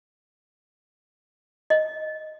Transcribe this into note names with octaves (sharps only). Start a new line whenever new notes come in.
D#5